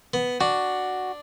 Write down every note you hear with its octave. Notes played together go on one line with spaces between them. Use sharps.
B3
D4 F#4